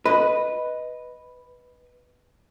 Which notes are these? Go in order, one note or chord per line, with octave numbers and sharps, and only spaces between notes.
B4 D#5